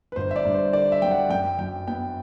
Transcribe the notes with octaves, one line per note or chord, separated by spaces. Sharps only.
B4
G1 C5
E5
D5
G2
C5
D3 D5
E5
F#3 G5
F#5
F#2 G5
F#3 G5
B3 G5